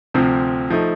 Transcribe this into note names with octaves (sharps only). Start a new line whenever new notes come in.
D2 C3 F3 C4
F3 A3 D#4